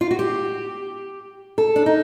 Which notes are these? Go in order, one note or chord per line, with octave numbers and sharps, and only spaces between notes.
F4
F#4
G4
A4
D4
D#4